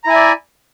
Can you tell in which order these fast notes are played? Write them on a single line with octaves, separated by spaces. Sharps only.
A#5 E4 G#5 E5 D5